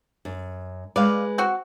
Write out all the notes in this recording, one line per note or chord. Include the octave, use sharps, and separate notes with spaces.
F#2
G#3 B4 D5 F5
C4 F#4